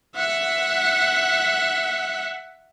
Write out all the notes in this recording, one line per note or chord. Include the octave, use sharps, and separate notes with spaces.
E5 F#5